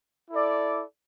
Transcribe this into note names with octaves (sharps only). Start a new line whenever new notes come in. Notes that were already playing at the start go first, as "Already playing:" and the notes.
E4 A4 D5